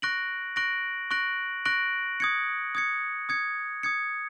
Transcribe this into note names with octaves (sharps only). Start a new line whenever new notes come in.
C#6 F#6 A#6 D7 F#7
C#6 F#6 A#6 D7 F#7
C#6 F#6 A#6 D7 F#7
C#6 F#6 A#6 D7 F#7
D#6 G#6 C#7
D#6 G#6 C#7
D#6 G#6 C#7
D#6 G#6 C#7